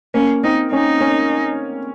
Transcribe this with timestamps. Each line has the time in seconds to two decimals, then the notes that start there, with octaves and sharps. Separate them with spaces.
0.14 A#3 C#4
0.44 C4 D#4
0.72 C#4 D#4
1.00 C#4